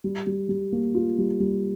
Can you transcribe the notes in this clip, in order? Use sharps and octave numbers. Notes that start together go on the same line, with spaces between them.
G3
G3
G3
A#3
F4
G3
G3